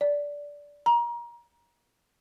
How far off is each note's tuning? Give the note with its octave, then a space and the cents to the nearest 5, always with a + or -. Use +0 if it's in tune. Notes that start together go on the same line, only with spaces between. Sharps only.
D5 -15
A#5 +30